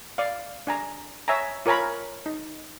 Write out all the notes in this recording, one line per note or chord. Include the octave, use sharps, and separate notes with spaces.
D5 F5
D4 G#5 A#5
C#5 E5 G#5 A#5
F4 A#4 C#5 G#5 A#5 B5
D#4